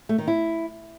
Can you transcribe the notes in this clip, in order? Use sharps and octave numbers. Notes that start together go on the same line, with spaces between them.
A3
D#3
E4